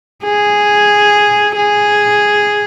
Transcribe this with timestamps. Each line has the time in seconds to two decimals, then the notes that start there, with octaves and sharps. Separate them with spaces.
0.25 G#4
1.56 G#4